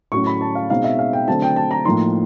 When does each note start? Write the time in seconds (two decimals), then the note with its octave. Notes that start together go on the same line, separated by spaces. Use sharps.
0.12 A2 F#3 A3 C#4 C#6
0.27 B5
0.41 A5
0.55 F5
0.70 B2 G#3 C4 D#4 F5
0.84 E5
0.99 F5
1.13 G5
1.27 D3 F#3 A3 C4 A5
1.42 G5
1.56 A5
1.71 A#5
1.85 A2 F3 A#3 D#4 C6